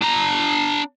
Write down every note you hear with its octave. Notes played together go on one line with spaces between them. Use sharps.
D4 A#5